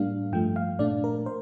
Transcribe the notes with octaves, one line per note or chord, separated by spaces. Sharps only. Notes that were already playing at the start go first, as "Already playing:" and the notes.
Already playing: A2 G3 A#3 D4 F5
G2 F3 A3 G5
F5
A#2 A3 D4 D5
A#4
C5